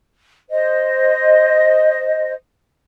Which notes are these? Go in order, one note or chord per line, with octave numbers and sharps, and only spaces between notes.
C5 D#5